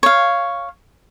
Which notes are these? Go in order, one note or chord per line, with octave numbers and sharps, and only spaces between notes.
C#5 F5